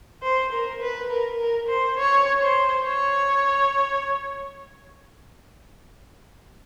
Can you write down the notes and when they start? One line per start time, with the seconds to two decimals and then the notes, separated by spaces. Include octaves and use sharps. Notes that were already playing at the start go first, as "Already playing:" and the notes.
0.23 C5
0.52 A#4
0.81 B4
1.10 A#4
1.39 A#4
1.68 C5
1.97 C#5
2.41 C5
2.85 C#5